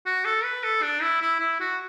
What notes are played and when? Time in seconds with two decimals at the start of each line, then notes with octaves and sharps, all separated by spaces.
0.06 F#4
0.25 A4
0.44 B4
0.63 A4
0.82 D4
1.02 E4
1.21 E4
1.40 E4
1.60 F#4